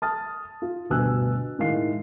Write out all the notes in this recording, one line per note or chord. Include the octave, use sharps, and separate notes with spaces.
A5 D#6 F6 A6
F4
D2 G2 B2 G#5 E6 F#6
A2 D#3 G#3 D#4 F5 C7